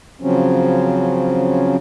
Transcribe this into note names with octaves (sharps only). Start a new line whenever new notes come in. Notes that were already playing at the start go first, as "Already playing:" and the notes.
C#3 F3 F#3 C4 C#4